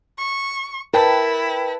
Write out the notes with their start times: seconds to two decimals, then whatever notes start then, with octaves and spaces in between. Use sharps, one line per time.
0.18 C#6
0.94 E4 A#4 B4 G5 A5